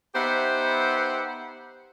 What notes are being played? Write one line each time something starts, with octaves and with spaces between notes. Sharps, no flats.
B3 D#4 G4 C5 E5 F#5